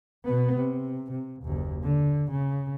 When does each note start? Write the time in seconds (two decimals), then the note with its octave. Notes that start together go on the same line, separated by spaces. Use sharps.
0.24 B2 B3
0.57 C3
1.12 C3
1.43 F#1 D#2
1.83 D3
2.31 C#3